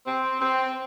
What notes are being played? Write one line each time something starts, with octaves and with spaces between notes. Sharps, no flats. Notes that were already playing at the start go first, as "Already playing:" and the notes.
C4
C4